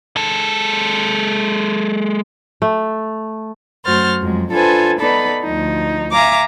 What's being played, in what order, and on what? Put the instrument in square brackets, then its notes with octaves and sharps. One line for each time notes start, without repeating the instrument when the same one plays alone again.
[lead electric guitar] G#3 A4
[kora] A3
[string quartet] F#2 A3 F#4 C5 F6 A6
F2 F#3 G#3
D4 F4 A4 B4 C5 G#5
B3 D#4 A4 B4 D5 B5
D2 F3 D#4
E5 F5 G#5 A#5 D6